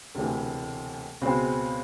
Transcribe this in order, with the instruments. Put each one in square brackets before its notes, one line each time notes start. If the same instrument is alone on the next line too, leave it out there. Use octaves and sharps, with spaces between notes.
[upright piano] E1 D2 C3 E3
C#2 B2 G#3 C4